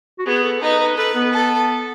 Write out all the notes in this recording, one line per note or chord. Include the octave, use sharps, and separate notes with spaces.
F#4
B3 G#4
A4
D#4 B4
B4
A4 B4
B3
A4